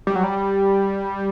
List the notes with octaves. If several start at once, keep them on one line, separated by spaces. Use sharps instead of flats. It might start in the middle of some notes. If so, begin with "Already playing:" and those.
G3
F#3
G3